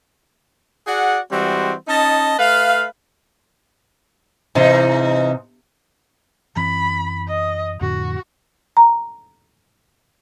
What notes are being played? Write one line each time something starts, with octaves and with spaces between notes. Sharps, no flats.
F#4 G#4 D5 F#5
E3 G3 G#3 C4 F#4
C#4 D#4 D#5 A5
A3 B4 F5
G#2 C3 E3 D#4
F#2 E3 C4 B5
D#5
F2 A2 D3 F#4
A#5